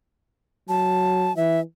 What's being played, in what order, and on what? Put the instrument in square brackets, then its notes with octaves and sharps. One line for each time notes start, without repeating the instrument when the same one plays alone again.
[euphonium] F#3 [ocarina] A5
[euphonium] E3 [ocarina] E5